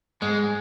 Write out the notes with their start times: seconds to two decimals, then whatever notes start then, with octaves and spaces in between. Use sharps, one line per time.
0.22 G#2 G#3